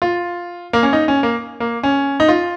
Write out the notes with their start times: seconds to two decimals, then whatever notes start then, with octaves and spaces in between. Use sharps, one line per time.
0.02 F4
0.73 A#3
0.83 C#4
0.93 D#4
1.08 C#4
1.23 A#3
1.60 A#3
1.83 C#4
2.20 D#4
2.28 F4